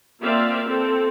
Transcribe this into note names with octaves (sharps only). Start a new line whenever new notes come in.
A#3 C4 F4 D5 E5 F5
C4 A4